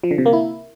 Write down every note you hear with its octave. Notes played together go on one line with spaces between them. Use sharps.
F3
D3
C3
A#3
E4